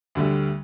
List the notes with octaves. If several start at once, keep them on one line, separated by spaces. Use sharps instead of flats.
D2 D3 G3